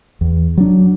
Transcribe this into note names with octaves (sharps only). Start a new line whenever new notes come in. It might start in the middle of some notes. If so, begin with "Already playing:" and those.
E2
F#3 D4